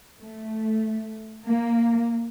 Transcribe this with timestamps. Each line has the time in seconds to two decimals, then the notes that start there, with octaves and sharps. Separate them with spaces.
0.18 A3
1.46 A#3